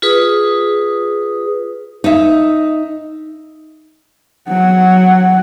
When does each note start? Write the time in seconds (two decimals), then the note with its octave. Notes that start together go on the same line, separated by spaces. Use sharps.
0.02 F4 G#4 B4 D#6
2.04 D#4 E5
4.48 F#3 F#5